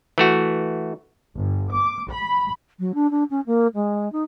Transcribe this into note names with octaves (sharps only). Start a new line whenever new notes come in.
E3 A3 F#4
G1
D6
B5
F#3
D4
D4
C#4
A#3
G#3
D#4